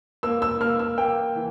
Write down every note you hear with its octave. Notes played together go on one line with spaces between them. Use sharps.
A#3 E6
E6
A#3 F6
E6
A#3 G5
E3